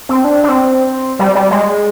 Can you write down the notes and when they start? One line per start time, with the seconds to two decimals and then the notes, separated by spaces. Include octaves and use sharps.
0.09 C4
0.24 D4
0.44 D4
0.49 C4
1.19 G3
1.35 G3
1.51 G#3